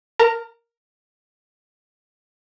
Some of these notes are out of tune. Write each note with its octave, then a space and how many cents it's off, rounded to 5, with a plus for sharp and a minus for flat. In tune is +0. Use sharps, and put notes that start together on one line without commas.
A#4 +0 A#5 -45